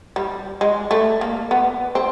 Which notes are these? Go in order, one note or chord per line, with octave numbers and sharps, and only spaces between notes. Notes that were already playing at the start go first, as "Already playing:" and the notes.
G3
G#3
A3
A#3
B3
C4